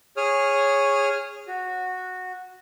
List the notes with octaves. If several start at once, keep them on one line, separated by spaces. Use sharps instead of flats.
G#4 C#5 D#6 F6
F#4